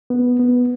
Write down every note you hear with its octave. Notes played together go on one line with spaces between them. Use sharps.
B3
B3